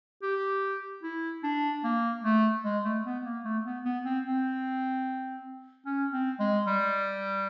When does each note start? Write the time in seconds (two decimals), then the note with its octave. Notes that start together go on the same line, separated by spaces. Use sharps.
0.23 G4
1.03 E4
1.44 D4
1.84 A#3
2.24 A3
2.64 G#3
2.85 A3
3.05 B3
3.24 A#3
3.44 A3
3.65 B3
3.85 B3
4.05 C4
4.26 C4
5.86 C#4
6.13 C4
6.39 G#3
6.67 G3